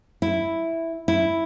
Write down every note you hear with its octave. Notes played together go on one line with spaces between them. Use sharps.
E4
E4